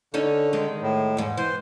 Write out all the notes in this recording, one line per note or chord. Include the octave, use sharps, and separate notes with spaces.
D3 C#4 D#4 A4
D#3 G#3
A2
E2 G#2
E3 C5